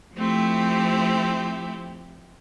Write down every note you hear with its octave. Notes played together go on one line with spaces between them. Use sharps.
F3 A3 C4 E4 G4